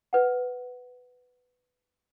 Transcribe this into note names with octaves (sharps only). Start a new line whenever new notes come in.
B4 F#5